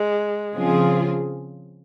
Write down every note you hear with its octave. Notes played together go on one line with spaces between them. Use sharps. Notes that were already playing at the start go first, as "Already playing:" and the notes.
Already playing: G#3
C#3 F3 C4 F4 G#4